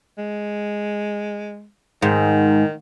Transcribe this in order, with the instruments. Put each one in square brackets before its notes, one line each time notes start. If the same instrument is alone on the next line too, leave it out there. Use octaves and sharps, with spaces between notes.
[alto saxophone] G#3
[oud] G#2 [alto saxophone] D#3